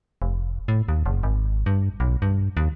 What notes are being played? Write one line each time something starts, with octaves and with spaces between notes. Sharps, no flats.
F1
A2
D#2
F#1
G#1
G2
B1
G2
D#2